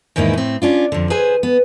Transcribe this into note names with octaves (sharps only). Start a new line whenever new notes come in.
E2 G#2 D#3 A#3 D#4 E4
A2 C4
C#4 D4 F4
F2 D3
G#4 B4 C5 G#5
B3